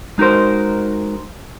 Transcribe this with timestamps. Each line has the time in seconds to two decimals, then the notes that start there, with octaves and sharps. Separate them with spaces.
0.18 G#3 D#4 F#4 A#4 C5